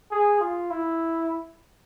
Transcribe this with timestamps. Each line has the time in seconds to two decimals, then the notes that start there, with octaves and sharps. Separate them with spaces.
0.12 G#4
0.41 F4
0.71 E4